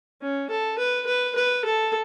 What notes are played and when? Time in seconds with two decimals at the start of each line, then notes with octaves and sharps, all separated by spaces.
0.21 C#4
0.50 A4
0.78 B4
1.07 B4
1.36 B4
1.65 A4